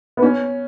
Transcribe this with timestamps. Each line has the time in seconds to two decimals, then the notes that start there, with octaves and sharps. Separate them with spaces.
0.17 B3
0.23 C#4